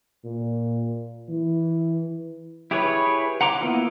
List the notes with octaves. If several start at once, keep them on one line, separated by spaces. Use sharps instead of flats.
A#2
E3
E4 G4 G#4 B4 C#5
F#5 A#5 C6 D6
A#3 B3 E4 F4